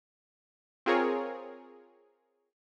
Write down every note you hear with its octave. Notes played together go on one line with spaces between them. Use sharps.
C4 F4 G#4 A#4 C#5